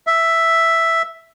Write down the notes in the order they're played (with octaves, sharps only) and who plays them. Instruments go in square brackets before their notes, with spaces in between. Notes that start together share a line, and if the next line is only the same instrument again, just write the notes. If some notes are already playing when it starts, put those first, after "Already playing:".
[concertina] E5